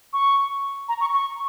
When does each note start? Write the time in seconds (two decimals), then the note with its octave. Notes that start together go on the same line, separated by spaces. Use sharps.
0.13 C#6
0.89 A#5
1.01 C#6
1.13 C#6